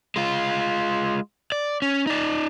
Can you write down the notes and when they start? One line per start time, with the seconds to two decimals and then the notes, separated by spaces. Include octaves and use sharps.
0.16 G#3 F4
1.52 D5
1.82 C#4
2.07 D#4 D5